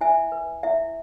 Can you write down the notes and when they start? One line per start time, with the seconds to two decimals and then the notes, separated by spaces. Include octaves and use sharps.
0.01 E4 E5 G#5
0.32 B4
0.63 E4 E5